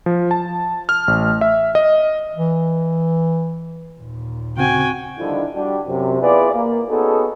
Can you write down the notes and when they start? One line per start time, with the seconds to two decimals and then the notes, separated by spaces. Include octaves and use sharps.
0.06 F3
0.31 A5
0.89 F6
1.08 A1
1.41 E5
1.75 D#5
2.35 E3
3.99 D#2 A#2
4.57 C#3 C4 F#4 G5 G#5
5.19 D3 D#3 F3 G3 D4 E4
5.55 G3 D4 F#4 G4
5.88 F#2 C3
6.21 B3 E4 F4 G#4 B4 D5
6.53 A#3
6.89 B3 C#4 D#4 F#4 G#4 A4